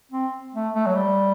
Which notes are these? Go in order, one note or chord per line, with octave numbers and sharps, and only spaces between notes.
C4
A3
A3
F#3
G3